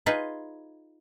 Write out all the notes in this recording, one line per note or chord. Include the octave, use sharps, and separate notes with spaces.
D#4 F4 G#4 B4 D#5